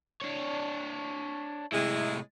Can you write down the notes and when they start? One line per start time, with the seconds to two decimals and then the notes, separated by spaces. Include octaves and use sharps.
0.22 D4 C#5
1.72 A2 C3 G#3 E4